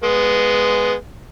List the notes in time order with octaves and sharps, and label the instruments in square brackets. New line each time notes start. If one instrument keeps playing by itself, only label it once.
[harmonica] G#3 B3